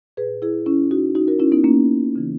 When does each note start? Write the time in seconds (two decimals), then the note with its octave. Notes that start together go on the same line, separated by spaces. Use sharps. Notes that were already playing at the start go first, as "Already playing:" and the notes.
0.17 A#2 G#4 B4
0.42 E4 G#4
0.66 C#4 E4
0.91 D#4 F#4
1.15 D#4 F#4
1.28 F#4 A#4
1.40 C#4 E4
1.52 B3 D#4
1.64 A#3 C#4
2.16 C#3 E3